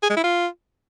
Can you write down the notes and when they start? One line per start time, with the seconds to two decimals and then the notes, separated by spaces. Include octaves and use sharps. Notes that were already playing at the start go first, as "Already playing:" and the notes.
0.03 G#4
0.10 G#3
0.17 E4
0.24 F4